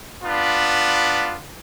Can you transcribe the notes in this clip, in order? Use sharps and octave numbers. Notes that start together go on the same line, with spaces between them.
B3 D4 F4 B5